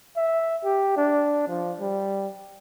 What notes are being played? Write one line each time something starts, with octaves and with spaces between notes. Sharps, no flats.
E5
G4
D4
F3
G3